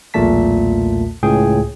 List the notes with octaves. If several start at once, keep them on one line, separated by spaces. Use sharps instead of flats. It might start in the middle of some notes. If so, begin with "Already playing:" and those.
B1 E2 A#2 A3 A5 B6
C#2 A2 G#4 G5